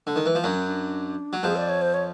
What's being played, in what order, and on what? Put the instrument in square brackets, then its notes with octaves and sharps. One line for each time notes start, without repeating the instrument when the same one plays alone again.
[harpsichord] D3
D#3
E3
F3
[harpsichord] F#2 F#3 [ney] D4
[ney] C#4
D4
[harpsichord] F#3
[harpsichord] F2 F3 [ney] G#4
[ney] D5
C#5
C5
C#5